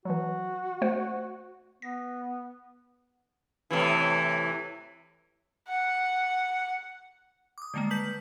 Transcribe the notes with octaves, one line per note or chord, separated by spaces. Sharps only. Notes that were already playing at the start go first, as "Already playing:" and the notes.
E3 F#3 F#4
A3 C5 F#5
B3 A#6
A2 C3 E3
F#5
D6 D#6
D3 D#3 G3 G#3 A#3
B4 A5 G6 B6 F#7